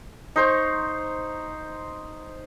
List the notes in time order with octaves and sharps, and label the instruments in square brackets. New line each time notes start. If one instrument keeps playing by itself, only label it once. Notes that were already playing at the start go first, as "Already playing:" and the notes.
[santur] D#4 C5 A#5 C#6